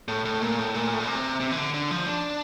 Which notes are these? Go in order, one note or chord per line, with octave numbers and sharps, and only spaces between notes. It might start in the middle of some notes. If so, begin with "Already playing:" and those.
A2
A2
A#2
A2
A#2
A2
A#2
C3
C3
E3
D3
D3
F3
D4